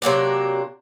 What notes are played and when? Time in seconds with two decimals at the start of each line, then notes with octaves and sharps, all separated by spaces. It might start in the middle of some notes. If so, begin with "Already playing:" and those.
0.02 C3 F#3 A#3 D4